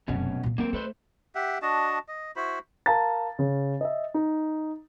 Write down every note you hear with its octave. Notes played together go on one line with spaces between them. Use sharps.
F1 F#2 B2 C#4
A#2 B3
D3 G3 A#3 C4 A#4
A3 A4 B4 C5
G4 E5 F#5
D4 F#4 D#5 A5
D#5
E4 F#4 C5 B5
A#4 F5 A5 A#5 A6
C#3
D#5 E5
D#4